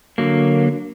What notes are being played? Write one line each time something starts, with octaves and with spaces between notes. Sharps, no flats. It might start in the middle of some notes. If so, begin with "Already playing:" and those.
D3 F#3 A#3